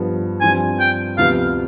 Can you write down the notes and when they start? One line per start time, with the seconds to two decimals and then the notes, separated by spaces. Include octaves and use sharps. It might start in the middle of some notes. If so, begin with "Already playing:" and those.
Already playing: G2 F3 B3
0.41 G2 F3 C4 G#5
0.80 G5
1.17 D2 C3 F3 B3 F5